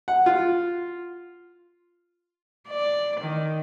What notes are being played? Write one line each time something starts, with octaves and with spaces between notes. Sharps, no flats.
F#5
F4
D5
D#3